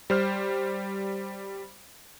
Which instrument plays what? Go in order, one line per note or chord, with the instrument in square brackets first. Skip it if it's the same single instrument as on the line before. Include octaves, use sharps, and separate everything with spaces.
[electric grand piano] G3 C5 F6